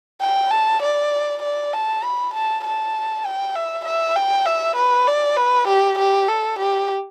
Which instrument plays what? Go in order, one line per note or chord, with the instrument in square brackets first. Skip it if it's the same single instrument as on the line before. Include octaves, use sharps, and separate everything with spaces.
[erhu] G5
A5
D5
D5
A5
B5
A5
A5
G5
E5
E5
G5
E5
B4
D5
B4
G4
G4
A4
G4